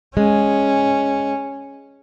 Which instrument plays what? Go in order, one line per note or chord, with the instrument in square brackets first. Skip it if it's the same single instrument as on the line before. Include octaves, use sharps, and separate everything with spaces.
[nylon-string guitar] G#3 [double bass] C#4